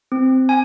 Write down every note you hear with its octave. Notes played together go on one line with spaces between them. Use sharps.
C4
G#5